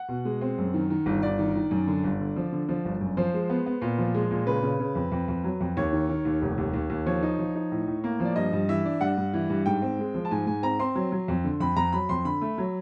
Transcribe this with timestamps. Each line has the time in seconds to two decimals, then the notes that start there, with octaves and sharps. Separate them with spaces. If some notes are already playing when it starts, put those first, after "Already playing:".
Already playing: F#5
0.08 B2
0.25 G#3
0.41 C4
0.58 F#2
0.74 D#3
0.90 D#3
1.06 G1
1.22 G1 D5
1.39 D#3
1.55 D#3
1.71 F#2
1.88 D3
2.04 G1
2.20 D3
2.36 F3
2.52 D3
2.69 F3
2.85 G1
3.01 F#2
3.17 F3 C5
3.34 G#3
3.50 B3
3.66 B3
3.82 A#2
3.98 F3
4.14 G#3
4.31 A#2
4.47 C#3 B4
4.63 C#3
4.80 C#3
4.95 F2
5.12 F2
5.28 F2
5.44 F#3
5.60 F2
5.77 D#2 C#5
5.93 D#3
6.09 D#3
6.25 D#2
6.42 F1
6.58 D#2
6.74 D#2
6.90 D#2
7.06 F3 C#5
7.23 D#4
7.39 F3
7.55 D#4
7.71 A2
7.87 A2
8.04 A#3
8.20 F3
8.25 D5
8.36 G2 D#5
8.52 G2
8.69 E3 E5
8.85 D4
9.01 G2 F#5
9.17 G2
9.33 E3
9.49 G2
9.66 G#2 G5
9.82 C4
9.99 G#3
10.14 F3
10.25 A5
10.31 G#2 G#5
10.47 G#2 G#5
10.63 C4 A#5
10.79 C4 C6
10.95 F#3
11.12 F#3
11.28 F2
11.44 D3
11.60 F2 B5
11.77 F2 A#5
11.92 F#3 B5
12.09 F2 C6
12.25 D3 B5
12.41 A3
12.58 F#3